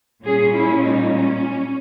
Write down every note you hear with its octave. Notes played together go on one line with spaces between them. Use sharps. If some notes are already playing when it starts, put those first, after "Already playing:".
A#2 G3 C#4 G#4
E4
D#4
C#4